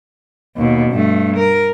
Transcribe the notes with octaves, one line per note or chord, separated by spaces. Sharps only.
D#2 B2
G2 A3
A#4